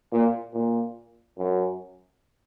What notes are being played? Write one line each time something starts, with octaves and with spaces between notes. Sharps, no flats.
A#2
A#2
F#2